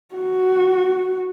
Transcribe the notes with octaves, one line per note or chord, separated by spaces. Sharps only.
F#4